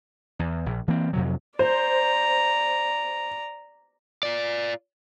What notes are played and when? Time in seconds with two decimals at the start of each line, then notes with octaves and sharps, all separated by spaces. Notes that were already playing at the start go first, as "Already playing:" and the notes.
0.39 E2
0.66 A#1
0.88 E3 A#3 C4
1.13 F2 C3 F#3
1.59 C5 D5 A#5
4.23 F4 D5